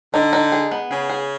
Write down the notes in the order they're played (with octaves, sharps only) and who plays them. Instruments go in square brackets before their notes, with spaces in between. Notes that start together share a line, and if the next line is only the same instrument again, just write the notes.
[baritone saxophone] D3 [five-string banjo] D#4
[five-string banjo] D#4
G#4
B3
[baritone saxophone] C#3 [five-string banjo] G#4
[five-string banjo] G#4